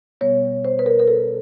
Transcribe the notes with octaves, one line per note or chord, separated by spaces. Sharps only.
B2 G3 B3 C#5
C5
B4
A#4
A#4
A4